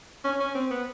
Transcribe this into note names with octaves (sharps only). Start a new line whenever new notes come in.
C#4
C#4
C4
B3